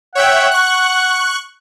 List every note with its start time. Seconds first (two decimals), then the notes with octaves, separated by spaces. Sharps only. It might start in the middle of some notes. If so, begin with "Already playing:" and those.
0.15 C#5 E5 F#5 G5
0.51 C#6 F#6